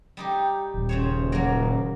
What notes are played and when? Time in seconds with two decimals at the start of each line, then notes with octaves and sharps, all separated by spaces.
0.17 G3 D#4 G4
0.74 D#1
0.89 C#3 C5 C#5
1.32 F#3 A#3